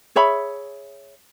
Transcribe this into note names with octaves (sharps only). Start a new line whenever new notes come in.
G#4 C#5 E5 B5